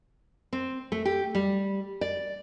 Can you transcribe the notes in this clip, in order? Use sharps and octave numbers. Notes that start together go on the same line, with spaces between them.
C4
A3
G4
G3
D5